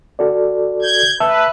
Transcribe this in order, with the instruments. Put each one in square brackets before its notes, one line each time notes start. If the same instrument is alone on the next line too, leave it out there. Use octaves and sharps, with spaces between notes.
[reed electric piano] F#4 A4 D5
[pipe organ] G6 G#6
[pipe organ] B4 [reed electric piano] E5 A5 E6